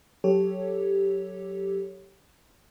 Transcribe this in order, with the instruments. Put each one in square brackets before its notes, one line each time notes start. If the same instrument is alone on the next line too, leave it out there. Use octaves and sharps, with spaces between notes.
[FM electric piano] F#3 G4 A4 C#5